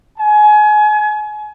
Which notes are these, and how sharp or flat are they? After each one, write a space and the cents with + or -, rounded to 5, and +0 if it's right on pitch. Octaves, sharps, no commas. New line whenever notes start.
G#5 +30